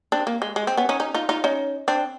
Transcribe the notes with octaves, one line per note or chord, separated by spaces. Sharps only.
C4 D4
A#3
G#3
G#3
C4
B3 C#4
C#4 D#4
C#4 D#4
D#4 F4
D#4 F4
C#4 D#4
C4 D4